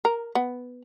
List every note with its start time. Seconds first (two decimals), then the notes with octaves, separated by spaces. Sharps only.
0.05 A#4
0.35 B3